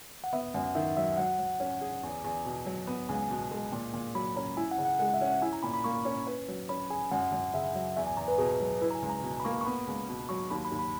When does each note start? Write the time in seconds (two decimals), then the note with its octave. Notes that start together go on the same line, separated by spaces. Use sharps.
0.24 F#5
0.33 B3 E5
0.54 F#2 F#5
0.75 D#3 E5
0.97 F#3 E5
1.17 F#3 F#5
1.39 F#3
1.60 C#4
1.81 G#4
2.03 E2
2.24 E2
2.45 B2
2.66 F#3
2.87 B3
3.09 C#2 G#5
3.30 B2
3.51 G#3
3.72 A#2
3.93 A#2
4.15 F#3 B5
4.36 C#4 A#5
4.57 E4 G#5
4.71 F#5
4.78 C#3
4.85 F#5
4.99 G#3 F#5
5.14 E5
5.21 C#4
5.28 F#5
5.42 E4 G#5
5.53 A#5
5.63 A#2 B5
5.74 B5
5.84 A#3 C#6
6.05 C#4
6.27 B4
6.48 F#3
6.69 C#4 B5
6.90 G#4 G#5
7.11 F#2 F#5
7.32 F#2
7.53 C#3 E5
7.75 F#3
7.96 E2 E5
8.07 G#5
8.17 E2 A#5
8.28 B4
8.38 B2 G#4
8.60 F#3
8.81 E4 B4
8.91 A#5
8.95 G#5
9.02 C#2
9.09 A#5
9.23 B2
9.40 B5
9.45 A#3 C#6
9.61 C#6
9.65 B3 B5
9.87 C#2
10.09 B2
10.29 F#3 C#6
10.51 D#2 B5
10.65 B5
10.72 D#2
10.79 B5